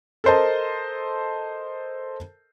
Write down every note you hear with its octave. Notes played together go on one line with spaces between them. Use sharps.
A4 A#4 C5 D#5 A5